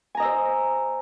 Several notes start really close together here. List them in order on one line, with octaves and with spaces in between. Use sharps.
G#5 A#5 D#5 E6 C5